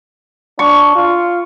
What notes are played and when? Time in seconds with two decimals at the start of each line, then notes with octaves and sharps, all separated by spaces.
0.59 D4 C#6
0.95 F4